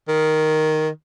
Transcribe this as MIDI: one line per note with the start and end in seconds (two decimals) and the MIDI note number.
0.08 0.89 51